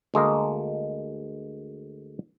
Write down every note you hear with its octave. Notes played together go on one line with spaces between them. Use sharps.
D2 G#3 A#3 D#5